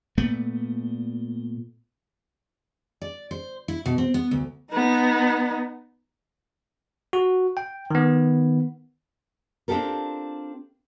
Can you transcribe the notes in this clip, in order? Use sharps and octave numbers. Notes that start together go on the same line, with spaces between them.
A#2 A3 B3
D5
C5
E4
B2
C4
B3
D2
B3 D#4
F#4
G5
D#3 B3
C4 D4 F4 G4 A4 A#4